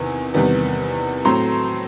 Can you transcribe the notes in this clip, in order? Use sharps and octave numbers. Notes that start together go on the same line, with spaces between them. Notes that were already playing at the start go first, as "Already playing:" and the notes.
Already playing: E2 C3 D#3 B3 G#5
E2 C3 D#3 G3 B3
A2 F#3 A3 C4 A#5 C6